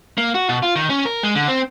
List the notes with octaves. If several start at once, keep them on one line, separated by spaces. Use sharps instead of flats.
A#3
F#4
B2
F4
D#3
C#4
A#4
G#3
D3
C4